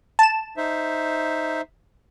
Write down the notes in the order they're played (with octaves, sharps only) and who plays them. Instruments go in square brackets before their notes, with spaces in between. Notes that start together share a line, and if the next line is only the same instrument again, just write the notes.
[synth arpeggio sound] A5 E7
[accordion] D#4 C5 E5